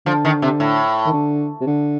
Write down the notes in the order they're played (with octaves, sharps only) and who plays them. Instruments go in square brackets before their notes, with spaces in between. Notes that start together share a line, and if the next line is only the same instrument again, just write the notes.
[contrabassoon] D3 [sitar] F3
[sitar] D#3
C3
A2
[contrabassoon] D#3
D3
C3
D3